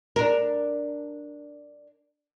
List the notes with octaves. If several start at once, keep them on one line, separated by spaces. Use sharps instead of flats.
D4 A#4